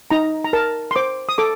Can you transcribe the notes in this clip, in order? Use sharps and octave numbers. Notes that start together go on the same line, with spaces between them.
D#4 A#5
A#5
A#4 A5
C6
C5 D6
D#6
A4 D6